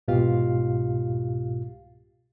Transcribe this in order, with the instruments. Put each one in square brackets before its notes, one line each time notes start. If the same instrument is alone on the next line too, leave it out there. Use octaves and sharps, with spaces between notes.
[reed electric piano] C2 G#2 B2 F4 G4 F5